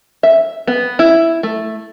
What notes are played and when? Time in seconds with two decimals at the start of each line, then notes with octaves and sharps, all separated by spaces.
0.23 E5
0.67 B3
0.99 E4
1.43 A3